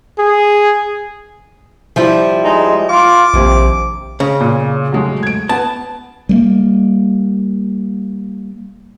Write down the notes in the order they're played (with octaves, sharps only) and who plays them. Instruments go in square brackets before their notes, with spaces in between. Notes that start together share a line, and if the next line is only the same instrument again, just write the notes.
[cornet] G#4
[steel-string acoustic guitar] F3 G3 E4
[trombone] G#3 [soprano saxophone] D#4
[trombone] F4 [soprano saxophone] D6
[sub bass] A#1 [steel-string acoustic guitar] D#2 [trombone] C3
[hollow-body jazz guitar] C#3
[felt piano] A#2
F#3 G#3 A3
G#6 D7
[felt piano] B3 [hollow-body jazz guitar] A5
[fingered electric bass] G3 A3 A#3